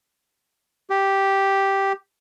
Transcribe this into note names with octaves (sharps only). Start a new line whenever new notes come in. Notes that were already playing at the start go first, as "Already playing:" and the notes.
G4